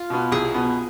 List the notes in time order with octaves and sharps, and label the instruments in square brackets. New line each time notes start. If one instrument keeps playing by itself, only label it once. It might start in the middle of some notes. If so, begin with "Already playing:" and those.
Already playing: [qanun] F4
[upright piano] B2 B3
[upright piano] C2 [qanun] G#4
[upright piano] B2 B3